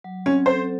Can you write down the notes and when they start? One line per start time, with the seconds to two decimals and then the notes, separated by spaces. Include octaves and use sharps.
0.04 F#3
0.26 C4 C#4
0.46 A4 C5